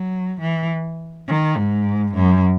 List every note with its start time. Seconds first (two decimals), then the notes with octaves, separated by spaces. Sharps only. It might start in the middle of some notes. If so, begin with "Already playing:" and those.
Already playing: F#3
0.41 E3
1.28 D#3
1.57 G#2
2.14 F#2